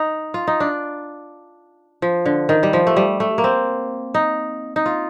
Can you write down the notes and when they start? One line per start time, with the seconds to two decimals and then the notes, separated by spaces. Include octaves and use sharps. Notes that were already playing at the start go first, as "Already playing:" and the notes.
Already playing: D#4
0.34 F4
0.47 D#4
0.60 D4
2.02 F3
2.26 D3
2.49 D#3
2.63 G3
2.73 F3
2.87 A3
2.96 G3
3.20 A3
3.38 A#3
3.44 C4
4.14 D#4
4.76 D#4
4.86 F4